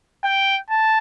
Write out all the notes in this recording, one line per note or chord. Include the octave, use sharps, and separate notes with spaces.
G5
A5